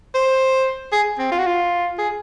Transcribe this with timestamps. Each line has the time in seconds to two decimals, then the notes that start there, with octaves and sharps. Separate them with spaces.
0.15 C5
0.92 G#4
1.19 C4
1.32 F4
1.39 F#4
1.46 F4
1.98 G#4